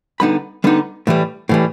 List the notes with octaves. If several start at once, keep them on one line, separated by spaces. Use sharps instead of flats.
D3 G3 B3 D#4 B5
D3 G3 B3 D#4
A2 E3 G3
A2 E3 G3